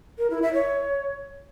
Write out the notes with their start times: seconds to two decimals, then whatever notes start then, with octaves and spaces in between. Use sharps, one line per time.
0.18 A#4
0.30 E4
0.42 E5
0.54 C#5